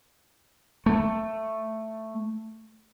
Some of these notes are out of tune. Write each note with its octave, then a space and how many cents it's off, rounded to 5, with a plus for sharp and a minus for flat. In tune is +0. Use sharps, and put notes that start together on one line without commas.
A3 +5